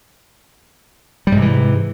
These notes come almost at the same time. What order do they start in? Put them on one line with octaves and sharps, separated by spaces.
G3 G#2 C3 E3